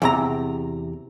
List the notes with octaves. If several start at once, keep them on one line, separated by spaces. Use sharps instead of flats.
E2 C3 A#5